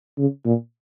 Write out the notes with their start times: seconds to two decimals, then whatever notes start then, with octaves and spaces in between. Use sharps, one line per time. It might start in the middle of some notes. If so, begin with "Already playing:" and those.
0.18 C#3
0.46 A#2